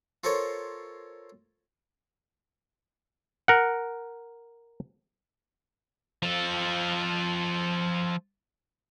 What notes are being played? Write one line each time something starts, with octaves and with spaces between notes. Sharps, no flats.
F4 A4 A#4 C5 C#5
A#4 F#5
F3 A4